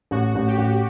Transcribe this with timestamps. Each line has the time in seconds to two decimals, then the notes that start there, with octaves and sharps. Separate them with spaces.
0.11 A1 F#4
0.35 A1
0.48 G4
0.58 A1